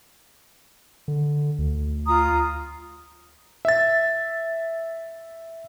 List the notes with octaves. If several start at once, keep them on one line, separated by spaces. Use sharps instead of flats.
D3
D2
F4 A#5 D#6
E5 A6